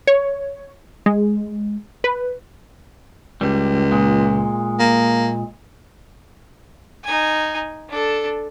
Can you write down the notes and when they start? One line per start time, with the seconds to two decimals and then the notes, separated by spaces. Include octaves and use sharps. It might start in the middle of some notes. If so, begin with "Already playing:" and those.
0.07 C#5
1.06 G#3
2.04 B4
3.41 C#2 G3
3.92 A#2 G#3
4.79 A#3
7.04 D#4 G#5
7.90 D4 A4